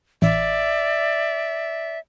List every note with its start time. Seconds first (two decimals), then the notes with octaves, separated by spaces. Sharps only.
0.22 A1 D5 E5